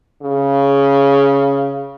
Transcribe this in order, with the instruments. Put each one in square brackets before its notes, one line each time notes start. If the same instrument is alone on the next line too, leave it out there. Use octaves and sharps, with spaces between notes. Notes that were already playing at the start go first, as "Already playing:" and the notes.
[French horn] C#3